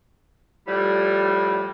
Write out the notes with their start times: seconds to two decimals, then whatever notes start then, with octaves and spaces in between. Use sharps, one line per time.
0.67 A2 F3 G3